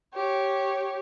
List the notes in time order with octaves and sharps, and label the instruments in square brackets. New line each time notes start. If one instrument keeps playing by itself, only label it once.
[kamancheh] G4 C#5